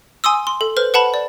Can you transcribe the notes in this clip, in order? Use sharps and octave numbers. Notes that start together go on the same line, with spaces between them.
G#5 C6 D#6 E6
C6
A4
B4 C5 F6
B4 F#5 A5 B5
D5